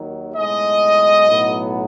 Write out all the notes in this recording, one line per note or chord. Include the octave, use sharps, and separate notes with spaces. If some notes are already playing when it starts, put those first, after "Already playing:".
Already playing: D#2 D#3 F#3
B1 A2 G#3 D#5
B1 A2 F#3 B3